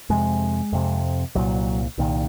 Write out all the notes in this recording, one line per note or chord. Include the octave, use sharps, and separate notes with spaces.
F2 C3 G#3
F2 C3
C2 A#2 F#3
C2 A#2 D#3